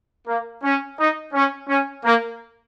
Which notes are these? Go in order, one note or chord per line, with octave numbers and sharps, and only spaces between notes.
A#3
C#4
D#4
C#4
C#4
A#3